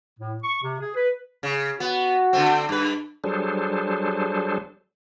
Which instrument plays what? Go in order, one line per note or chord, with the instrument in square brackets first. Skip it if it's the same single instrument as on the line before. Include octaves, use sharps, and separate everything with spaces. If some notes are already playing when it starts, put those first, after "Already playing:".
[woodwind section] A2
C#6
C3
G#4
B4
[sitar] C#3
[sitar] B3 [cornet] F#4
[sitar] D3 A3 C4
G2 B4
[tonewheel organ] F#3 G3 D4 G#4 A4 C5